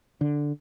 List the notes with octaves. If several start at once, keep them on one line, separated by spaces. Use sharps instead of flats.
D3